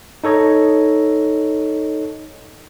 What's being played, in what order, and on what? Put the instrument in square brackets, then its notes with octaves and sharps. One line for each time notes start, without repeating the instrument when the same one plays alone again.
[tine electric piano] D#4 A4 C#5 D#5